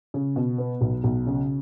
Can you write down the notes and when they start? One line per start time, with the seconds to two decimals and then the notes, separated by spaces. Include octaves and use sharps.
0.14 C#3
0.36 B2
0.58 B3
0.81 B1
1.04 B1
1.26 C#3